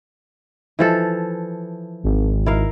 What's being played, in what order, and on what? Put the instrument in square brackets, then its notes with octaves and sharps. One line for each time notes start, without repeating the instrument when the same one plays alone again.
[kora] E3 F3 A4
[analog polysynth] G#1
[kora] E4 A#4 F5